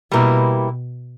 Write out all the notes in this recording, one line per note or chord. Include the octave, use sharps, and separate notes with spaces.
B2 G3 A#3 E4 B4